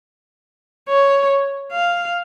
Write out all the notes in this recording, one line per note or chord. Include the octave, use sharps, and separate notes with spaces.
C#5
F5